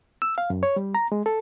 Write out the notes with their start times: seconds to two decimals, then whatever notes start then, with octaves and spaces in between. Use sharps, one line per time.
0.22 E6
0.38 F5
0.50 F#2
0.63 C#5
0.76 G3
0.95 A#5
1.12 G#3
1.26 A4